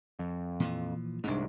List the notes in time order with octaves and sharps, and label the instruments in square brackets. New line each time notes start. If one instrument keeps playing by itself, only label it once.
[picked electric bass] F2
[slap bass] A#2 E3 F3
[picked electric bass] C2 G#2 [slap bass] G#3 C4 D4